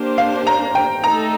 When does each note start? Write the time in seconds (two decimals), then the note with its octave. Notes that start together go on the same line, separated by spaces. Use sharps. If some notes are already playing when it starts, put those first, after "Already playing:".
Already playing: A#3 D4 G4 C5
0.18 F5
0.47 A#5
0.75 G5
1.03 A3 D#4 A4 A#5